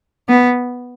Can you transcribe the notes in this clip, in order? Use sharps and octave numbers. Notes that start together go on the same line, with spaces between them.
B3